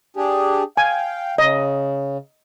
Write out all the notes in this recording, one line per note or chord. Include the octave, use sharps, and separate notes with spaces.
D4 G4 G#4
F5 G5 G#5
C#3 D#5